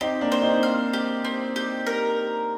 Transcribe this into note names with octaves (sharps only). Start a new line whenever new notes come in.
C4 D#4 G4
A#3 D4
C5
C4 D#4
F5
G4
C4
G4
A#4